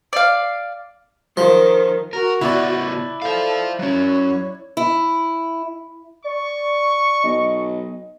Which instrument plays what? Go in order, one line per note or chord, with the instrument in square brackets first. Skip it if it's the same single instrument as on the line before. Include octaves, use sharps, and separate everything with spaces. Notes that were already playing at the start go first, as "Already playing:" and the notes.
[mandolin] D5 F5
[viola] D#3 [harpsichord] F3
[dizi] F#4 [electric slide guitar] A#4
[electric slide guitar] C#3 B3 [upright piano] E4 D5
[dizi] A4 [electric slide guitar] C5 F5
[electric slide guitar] F#3 C#4 [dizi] C#5
[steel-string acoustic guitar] E4
[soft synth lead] D5 [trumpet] C#6
[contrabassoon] B1 [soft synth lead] D#5